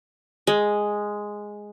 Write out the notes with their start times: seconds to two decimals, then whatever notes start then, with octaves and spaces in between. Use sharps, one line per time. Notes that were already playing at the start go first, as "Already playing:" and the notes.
0.47 G#3